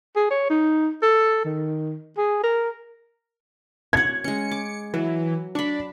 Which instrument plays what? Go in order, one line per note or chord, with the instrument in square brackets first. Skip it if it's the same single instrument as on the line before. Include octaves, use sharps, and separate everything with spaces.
[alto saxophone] G#4
C#5
D#4
A4
D#3
G#4
A#4
[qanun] C#5 F#5 [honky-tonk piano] G#6
[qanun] G#3 C#4 [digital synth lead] C#7
[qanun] D6
[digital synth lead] E3 [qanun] F#3
[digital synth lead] D4 [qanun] B5 C#6